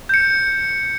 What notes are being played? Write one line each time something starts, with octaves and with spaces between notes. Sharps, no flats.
G6 C#7